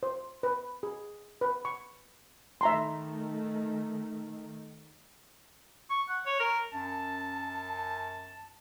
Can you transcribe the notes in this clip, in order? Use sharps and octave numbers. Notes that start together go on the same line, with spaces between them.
C5
B4
G#4
B4
C#6
D#3 A3 E5 A#5 C6
C#6
F#5
C#5
A#4
F#2 A5